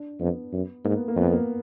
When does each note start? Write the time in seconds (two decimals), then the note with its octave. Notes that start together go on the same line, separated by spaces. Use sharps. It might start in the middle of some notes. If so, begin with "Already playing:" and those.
Already playing: D4
0.20 F2 B3
0.53 F#2
0.84 G#2 A#3
0.96 B3
1.08 A#3
1.16 F2 B3
1.32 A#3